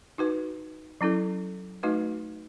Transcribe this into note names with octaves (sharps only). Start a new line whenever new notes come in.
D#4 F#4 B4
F#3 C#4 E4 A4
A3 D#4 F#4 B4 D#5